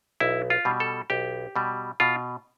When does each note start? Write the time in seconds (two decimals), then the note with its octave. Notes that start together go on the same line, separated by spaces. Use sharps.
0.20 B1 E4
0.50 F4
0.65 B2 G3
0.80 A4
1.10 B1 G4
1.56 B2 G3
2.00 B2 F4